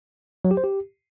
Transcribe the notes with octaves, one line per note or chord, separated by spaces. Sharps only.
F#3
G4
C5
G4